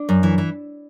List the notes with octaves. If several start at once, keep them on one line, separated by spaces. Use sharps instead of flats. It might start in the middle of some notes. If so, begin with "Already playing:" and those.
Already playing: D4
F#2
E3
E3